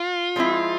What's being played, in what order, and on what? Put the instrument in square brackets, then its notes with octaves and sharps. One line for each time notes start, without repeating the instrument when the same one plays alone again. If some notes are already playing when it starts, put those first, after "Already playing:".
Already playing: [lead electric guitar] F4
[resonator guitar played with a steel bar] F3 G#3 C4 E4